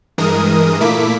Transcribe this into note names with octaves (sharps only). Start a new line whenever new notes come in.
G2 E3 G#3 A#4 D#6
A#2 A3 A#3 E4 D6 B6